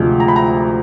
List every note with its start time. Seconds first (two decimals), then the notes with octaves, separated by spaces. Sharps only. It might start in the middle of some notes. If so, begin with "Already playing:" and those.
Already playing: D2 C3 F3 G#3
0.20 A#5
0.28 B5
0.36 A#5